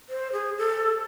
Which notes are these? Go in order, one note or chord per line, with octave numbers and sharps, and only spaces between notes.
C5
G#4
A4